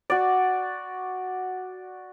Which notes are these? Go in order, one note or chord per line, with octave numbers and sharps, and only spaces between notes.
F#4 D5